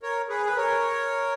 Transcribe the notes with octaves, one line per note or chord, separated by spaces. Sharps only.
A#4 C#5
G#4 B4
B4
A#4 C#5